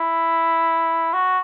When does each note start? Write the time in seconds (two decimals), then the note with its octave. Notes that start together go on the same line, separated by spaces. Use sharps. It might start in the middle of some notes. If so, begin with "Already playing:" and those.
Already playing: E4
1.14 F#4